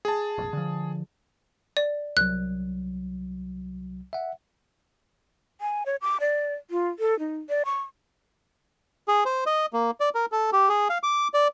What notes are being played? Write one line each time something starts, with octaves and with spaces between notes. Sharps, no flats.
G#4 A5
F1 A#1
D3 F3
D5
C2 F#3 F#6
E5 F#5
G#5
C#5
D6
D5
F4
A4
D#4
D5
C#6
G#4
C5
D#5
A#3
D5
A#4
A4
G4
G#4
F5
D6
D5